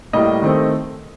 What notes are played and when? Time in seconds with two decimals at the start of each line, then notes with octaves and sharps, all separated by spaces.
0.13 A2 G3 A#3 D#5
0.42 D#3 A3 C4